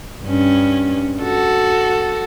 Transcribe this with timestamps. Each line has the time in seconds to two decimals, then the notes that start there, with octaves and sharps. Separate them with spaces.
0.24 G2 C#4
1.22 F#4 A4